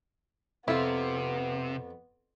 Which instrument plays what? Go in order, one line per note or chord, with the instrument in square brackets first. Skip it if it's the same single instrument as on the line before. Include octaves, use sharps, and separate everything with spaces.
[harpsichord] F2 [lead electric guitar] C3 [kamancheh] B3 [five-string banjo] E4 F4